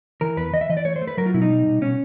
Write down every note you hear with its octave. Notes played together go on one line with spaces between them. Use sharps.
E3 A#4
E2 B4
E3 D#5
E5
E3 D#5
D5
A3 C#5
C5
A3
B4
F#3 A#4
F4
B2 E4
D#4
G3
B2
B2 C#4